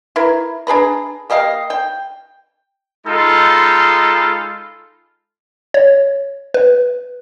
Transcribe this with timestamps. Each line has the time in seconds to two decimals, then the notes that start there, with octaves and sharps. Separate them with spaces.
0.16 E4 A#4 B4
0.67 D4 G#4 B4 A#5
1.30 A#3 G4 D#5 F5
1.70 G5
3.06 G#3 D#4 F4 A4 B5
5.74 C#5
6.54 B4